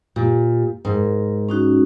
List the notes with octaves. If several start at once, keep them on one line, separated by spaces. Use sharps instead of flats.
A#2 G4
G#2 A#4
C#4 D#4 F#4